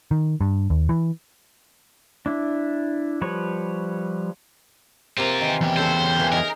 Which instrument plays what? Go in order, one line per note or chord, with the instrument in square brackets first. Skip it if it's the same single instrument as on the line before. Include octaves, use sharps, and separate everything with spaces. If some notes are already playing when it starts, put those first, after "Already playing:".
[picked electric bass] D#3
G2
D#2
E3
[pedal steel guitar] D4 E4
F3 G3 B4 C#5
[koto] C3 A#3 A#4 [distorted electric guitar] C4 F4
[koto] D#3 E3
[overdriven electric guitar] E2 G4
[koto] C#3 A4 [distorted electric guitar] C5
[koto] E3 A#4
[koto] D#4 G#4 [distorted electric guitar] A#4